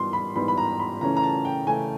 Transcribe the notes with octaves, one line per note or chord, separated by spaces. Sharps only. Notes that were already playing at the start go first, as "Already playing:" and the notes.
Already playing: G#2 E3 G3 B3 C6
B5
G#2 E3 G3 B3 B5
B5
A#5
B5
C#3 E3 A3 C#4 A#5
A#5
A5
G5
C#3 E3 A3 C#4 G#5